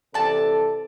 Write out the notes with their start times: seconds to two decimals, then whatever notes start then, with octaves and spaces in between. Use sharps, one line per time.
0.14 C3 E3 A4 D5 A5